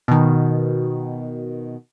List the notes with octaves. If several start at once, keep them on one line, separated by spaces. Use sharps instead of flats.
B2 D#3